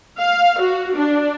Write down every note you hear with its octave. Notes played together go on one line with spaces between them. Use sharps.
F5
F#4
D4